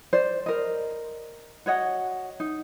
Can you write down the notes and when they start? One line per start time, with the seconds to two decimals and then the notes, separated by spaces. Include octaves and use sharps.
0.13 C5 D5
0.46 A#4 D#5
1.66 F#4 C#5 D#5 F#5
2.40 D#4